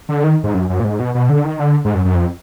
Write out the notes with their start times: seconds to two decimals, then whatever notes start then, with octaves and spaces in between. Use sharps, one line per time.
0.09 D3
0.24 D#3
0.44 G#2
0.54 F#2
0.70 F#2
0.80 A#2
0.85 G#2
0.99 B2
1.15 B2
1.29 D3
1.45 D#3
1.60 D3
1.85 G#2
1.95 F#2
2.05 F#2
2.15 F2